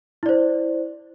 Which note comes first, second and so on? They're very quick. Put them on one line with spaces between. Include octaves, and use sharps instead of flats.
E4 D5 C5